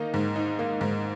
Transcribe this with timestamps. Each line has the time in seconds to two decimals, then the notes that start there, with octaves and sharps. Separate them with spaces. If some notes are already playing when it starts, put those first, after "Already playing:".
Already playing: D#3 A#3 D#4
0.14 G#2
0.36 D#4
0.59 A#3
0.81 G#2